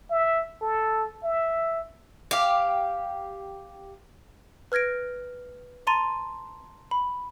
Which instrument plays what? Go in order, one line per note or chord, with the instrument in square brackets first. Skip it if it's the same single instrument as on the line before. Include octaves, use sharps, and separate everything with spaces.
[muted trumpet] E5
A4
E5
[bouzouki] G4 F5
[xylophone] B4 F6 G#6 A#6 D7
A5 A#5 C6 A6 D#7
B5